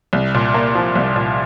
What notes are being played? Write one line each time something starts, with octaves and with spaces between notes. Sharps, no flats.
C2
A#2
A#3
F3
C2
A#2